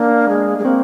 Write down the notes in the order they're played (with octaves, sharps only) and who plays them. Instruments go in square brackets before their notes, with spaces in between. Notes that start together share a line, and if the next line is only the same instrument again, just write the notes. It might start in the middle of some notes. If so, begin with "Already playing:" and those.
Already playing: [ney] A#3 [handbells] D4 D5
[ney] G#3
G#3
[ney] A#3 [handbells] C4 C5